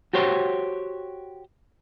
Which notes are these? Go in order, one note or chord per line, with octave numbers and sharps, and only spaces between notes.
F#4 G4 C5 C#5